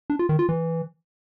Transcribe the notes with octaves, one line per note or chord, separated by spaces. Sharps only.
D4
F4
D#3
F4
E3